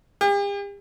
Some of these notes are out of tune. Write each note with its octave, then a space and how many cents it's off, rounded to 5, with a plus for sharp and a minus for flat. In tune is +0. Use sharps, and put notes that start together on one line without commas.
G4 +45